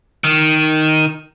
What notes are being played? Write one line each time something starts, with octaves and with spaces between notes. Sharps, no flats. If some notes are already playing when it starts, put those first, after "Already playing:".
D#3